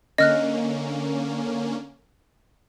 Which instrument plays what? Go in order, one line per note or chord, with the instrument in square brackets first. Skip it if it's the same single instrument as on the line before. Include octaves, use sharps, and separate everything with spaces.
[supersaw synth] D3 A#3 C#4 [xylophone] D#5 F6 F#6